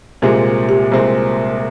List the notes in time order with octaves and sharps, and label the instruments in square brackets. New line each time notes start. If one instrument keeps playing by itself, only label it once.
[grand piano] C2 A#2 G#3 C4 [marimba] G4
[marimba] G4
[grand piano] C2 A#2 G#3 C4